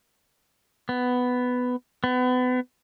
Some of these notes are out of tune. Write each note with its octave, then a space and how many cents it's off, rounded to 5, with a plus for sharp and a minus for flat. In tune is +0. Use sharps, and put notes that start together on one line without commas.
B3 +10
B3 +30